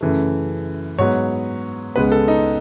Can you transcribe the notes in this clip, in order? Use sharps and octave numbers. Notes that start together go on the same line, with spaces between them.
F#2 C#3 E3 A3
G#2 F#3 B3 C#5
C#2 C#3 G#3 B3 B4
A4
D#4